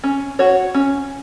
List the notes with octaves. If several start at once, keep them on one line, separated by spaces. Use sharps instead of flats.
C#4
F#4 C#5
C#4